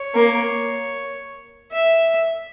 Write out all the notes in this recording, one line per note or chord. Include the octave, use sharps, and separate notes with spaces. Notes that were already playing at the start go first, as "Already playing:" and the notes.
Already playing: C#5
A#3
E5